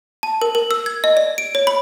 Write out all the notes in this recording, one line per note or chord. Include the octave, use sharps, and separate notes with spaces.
A5
A#4
A#4
E6
G#6
D#5
D5
D7
C#5
B5